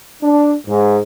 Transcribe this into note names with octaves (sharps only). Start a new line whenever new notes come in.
D4
G#2